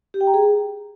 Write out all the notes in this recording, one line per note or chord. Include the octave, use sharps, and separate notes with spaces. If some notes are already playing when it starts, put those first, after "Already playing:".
G4
G5
A#5
G#4